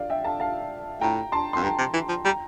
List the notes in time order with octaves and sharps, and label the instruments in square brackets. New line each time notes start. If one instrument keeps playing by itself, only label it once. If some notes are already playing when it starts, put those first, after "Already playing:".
Already playing: [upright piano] D5 F5
E5 G5
F5 A5
F5 A5
[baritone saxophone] A2 [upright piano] G5 A#5
[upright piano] A5 C6
[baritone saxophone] F2 [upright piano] C6
[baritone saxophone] G2 [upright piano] G5 A#5
[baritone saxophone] C3
E3
F3
[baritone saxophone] G3 [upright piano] G5 A#5